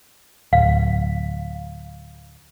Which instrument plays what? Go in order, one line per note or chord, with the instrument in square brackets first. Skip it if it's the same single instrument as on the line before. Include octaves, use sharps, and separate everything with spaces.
[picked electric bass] D1 [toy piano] F5